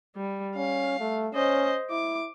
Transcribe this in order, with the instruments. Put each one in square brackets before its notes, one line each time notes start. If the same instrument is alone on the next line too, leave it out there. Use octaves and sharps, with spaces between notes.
[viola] G3
[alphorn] C#4 [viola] F5
[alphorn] A3
[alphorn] C#4 [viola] C5 D#5
[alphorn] E4 [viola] D6